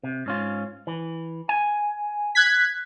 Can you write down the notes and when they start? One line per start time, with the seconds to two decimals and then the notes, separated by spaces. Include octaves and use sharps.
0.03 C3
0.26 G#2 C#4 F4
0.87 E3
1.49 G#5
2.35 F#6 G#6 B6